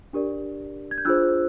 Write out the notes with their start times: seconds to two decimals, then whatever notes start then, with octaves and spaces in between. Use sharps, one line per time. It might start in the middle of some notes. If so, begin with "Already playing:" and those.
0.13 D4 G4 A#4 D5
0.91 G#6
0.98 G6
1.05 D4 F4 G#4 C5 E6 F#6